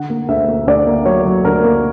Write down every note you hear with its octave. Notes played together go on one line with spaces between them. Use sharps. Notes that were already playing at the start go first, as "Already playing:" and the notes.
Already playing: D3 F#5
A#3
D2 E5
A#3
D2 D5
A#3
F#3 C#5
F#3
D2 A#4
A#3